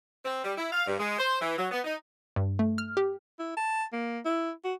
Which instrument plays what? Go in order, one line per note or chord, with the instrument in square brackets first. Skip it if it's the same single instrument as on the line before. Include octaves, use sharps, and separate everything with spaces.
[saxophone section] C4
G3
E4
F5
G2
G#3
C5
E3
F#3
B3
D#4
[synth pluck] G2
A3
F6
G4
[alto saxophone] E4
A5
A#3
E4
F#4